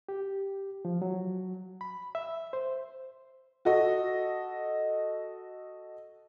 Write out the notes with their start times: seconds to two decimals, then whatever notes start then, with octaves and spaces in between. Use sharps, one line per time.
0.09 G4
0.85 F3
1.02 F#3
1.81 B5
2.15 E5
2.53 C5
3.65 F#4 A4 D#5